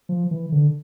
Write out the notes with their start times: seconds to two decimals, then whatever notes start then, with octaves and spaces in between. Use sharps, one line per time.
0.09 F3
0.31 E3
0.52 D3